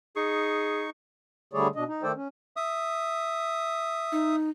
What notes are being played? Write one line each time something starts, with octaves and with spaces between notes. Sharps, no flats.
D#4 G#4 C#6
D3 G3 A3 G#4 C#5 D5
B2 D4 D#5
D#4
D#3 A3 A4 C5 D5 G5
C#4
E5 D#6
D#4